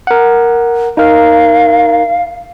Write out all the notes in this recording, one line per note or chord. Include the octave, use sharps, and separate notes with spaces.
A#4 F#5
D#4 A#4 F5